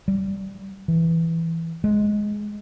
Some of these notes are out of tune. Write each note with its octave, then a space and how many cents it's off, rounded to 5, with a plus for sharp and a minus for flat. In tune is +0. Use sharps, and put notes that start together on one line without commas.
G3 -15
E3 +0
G#3 +5